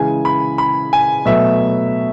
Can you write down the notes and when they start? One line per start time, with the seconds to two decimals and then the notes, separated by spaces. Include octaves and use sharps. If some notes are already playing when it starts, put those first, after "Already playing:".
Already playing: C#3 E3 G#3 G#5
0.25 B5
0.58 B5
0.93 G#5
1.25 B2 F#3 A3 E5